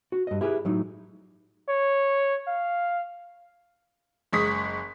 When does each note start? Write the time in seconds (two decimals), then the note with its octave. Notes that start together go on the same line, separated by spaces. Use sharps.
0.12 F#4
0.27 G2 D#5
0.41 E4 G4 G#4 B4
0.65 A2 F#3 D#4
1.69 C#5
2.48 F5
4.33 F#1 G#3 C#6 D#6 B6